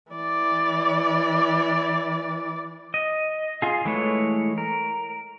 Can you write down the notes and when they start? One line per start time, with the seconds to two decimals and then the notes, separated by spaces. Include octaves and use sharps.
0.12 E3 D5
2.94 D#5
3.62 F4 G#4
3.85 E3 G#3 A3 E4 C#5
4.58 A#4